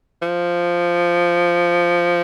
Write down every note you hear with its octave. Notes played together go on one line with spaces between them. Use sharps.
F3